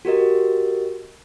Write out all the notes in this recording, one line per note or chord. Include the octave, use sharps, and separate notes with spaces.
F#4 G4 A#4 D#5